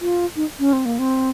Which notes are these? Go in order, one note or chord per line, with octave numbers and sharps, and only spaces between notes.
F4
D#4
C#4
C4
A#3
C4